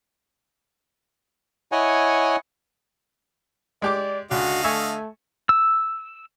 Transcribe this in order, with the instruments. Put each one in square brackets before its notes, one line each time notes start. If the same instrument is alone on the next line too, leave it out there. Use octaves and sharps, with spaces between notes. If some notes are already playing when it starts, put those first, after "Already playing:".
[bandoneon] E4 C#5 D#5 F#5 G#5
[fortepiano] G#3 G4 D6 [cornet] D5
[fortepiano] C#2 [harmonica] D3 D#5 F5 [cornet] F#4
[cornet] A3 [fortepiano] E5 G#5 C#6
[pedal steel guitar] E6